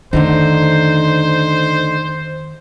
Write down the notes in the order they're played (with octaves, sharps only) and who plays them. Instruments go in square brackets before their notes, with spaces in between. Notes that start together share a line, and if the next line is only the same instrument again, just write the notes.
[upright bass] F2 D#3 [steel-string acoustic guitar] D3 A3 D#4 [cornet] C5